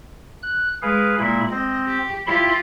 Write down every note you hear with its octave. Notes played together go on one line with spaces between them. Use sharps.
F#6
G#3 G#4 B4 F5
A#2 G#3 A#3 E4 B5
C4 D#5
G4
E4 F4 G4 B5 C6